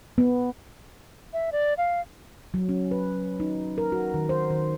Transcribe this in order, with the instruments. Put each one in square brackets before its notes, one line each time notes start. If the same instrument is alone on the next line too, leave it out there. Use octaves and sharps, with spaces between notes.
[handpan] B3
[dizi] E5
D5
F5
[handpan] F#3
C#4
B4
D#4
A#4
F#4
D#3
C5
D#3